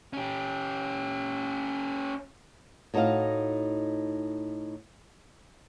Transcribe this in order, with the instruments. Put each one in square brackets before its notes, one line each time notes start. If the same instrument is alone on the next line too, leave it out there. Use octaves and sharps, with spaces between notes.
[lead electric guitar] C#4 G4
[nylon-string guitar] A2 D#4 F#4 C#5 D#5 F5